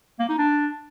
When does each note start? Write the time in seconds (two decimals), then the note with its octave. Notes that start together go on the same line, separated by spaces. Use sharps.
0.20 A#3
0.29 D#4
0.38 D4